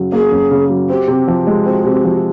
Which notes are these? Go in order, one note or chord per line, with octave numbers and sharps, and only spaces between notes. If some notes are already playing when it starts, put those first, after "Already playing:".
Already playing: F#2 C#3 F#3
A#3 G#4
F#2
C#3
F#3
C4 G4
C3
F3
G#3
C4 F#4
C3
F3